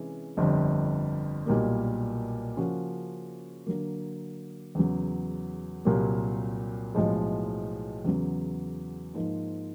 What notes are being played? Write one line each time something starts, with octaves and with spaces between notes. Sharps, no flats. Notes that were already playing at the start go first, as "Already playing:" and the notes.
Already playing: C3 E3 G#3 C#4
G1 F2 D3 G3
B1 A#2 G3 A#3
C#3 F3 A#3 C#4 F#4
D3 F#3 A#3
E2 C#3 F#3
C2 A#2 F#3 A#3
B1 A2 F3 G#3
E2 C#3 F#3
G#2 F3 A#3 D#4